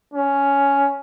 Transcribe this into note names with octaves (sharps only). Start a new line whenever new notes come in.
C#4